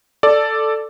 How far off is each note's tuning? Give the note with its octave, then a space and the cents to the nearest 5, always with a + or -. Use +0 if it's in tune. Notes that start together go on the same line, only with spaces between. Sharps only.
A4 +0 D5 +0